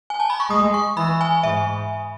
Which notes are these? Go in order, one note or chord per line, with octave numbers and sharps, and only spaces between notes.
G#5
A5
B5
C#6
G#3 D#6
C#6
E3 B5
G#5
G#2 E5